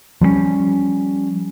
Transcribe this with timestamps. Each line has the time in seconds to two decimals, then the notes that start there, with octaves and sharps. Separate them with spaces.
0.21 F3 G3 A3 C#4